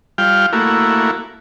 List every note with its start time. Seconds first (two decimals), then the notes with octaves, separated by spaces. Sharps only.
0.18 G3 F4 F5 G5
0.53 A3 A#3 E4 F#4